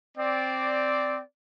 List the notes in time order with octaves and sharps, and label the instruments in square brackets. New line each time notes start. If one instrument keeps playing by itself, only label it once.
[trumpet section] C4 D5